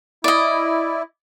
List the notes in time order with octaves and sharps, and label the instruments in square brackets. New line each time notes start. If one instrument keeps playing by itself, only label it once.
[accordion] E4 [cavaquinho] D5 D#5